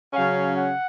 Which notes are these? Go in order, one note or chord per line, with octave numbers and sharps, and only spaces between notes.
C#3 F#3 C#4 F5
F#5